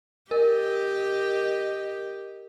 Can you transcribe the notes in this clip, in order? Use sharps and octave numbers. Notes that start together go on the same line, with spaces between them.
G4 A#4 D#5